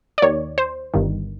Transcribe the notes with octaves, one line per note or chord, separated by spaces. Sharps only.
D5
D#2 D#3 C#5
C5
G1 G2 D#3